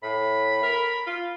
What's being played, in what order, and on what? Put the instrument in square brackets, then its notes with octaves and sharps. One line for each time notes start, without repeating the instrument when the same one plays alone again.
[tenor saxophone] A2 [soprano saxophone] B5
[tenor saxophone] A#4
F4